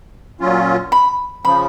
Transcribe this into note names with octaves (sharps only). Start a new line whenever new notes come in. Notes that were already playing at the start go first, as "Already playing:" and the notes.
A#2 F#3 C#4 F4
B5
C#3 F3 B5